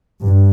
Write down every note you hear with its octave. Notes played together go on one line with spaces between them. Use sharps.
G2